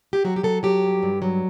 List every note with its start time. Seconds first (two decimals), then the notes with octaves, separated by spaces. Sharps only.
0.13 G4
0.25 F#3 F#4
0.36 G4
0.43 F#3 A4
0.63 F#3 G4
0.83 G2
1.03 G2
1.22 F#3